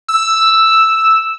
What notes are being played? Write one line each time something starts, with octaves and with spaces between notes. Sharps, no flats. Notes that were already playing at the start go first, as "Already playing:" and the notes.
E6